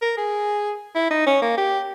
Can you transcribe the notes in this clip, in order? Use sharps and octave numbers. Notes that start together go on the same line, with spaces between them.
A#4
G#4
E4
D#4
C#4
A#3
G4